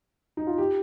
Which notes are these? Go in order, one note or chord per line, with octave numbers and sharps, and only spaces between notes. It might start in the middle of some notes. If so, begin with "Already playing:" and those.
D#4
F4
G4